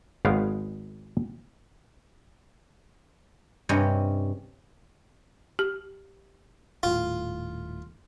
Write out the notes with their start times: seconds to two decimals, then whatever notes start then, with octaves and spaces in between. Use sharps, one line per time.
0.25 G#1 G#3 B3 C#4 F5 G5
3.69 G2 C3 C#4 D#5
5.59 G4
6.83 D#1 A2 F4